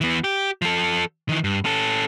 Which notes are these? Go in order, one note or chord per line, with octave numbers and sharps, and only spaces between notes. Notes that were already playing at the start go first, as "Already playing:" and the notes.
E3 B3
G4
F3 A4
D#3 E3
G2
C#4 A4